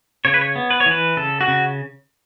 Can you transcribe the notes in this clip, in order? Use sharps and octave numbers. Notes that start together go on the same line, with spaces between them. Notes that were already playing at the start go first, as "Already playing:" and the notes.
C#3 C#5
B4
C#5
B3
B4
C#5
E3 B4
C#3 A4
F#4
C#3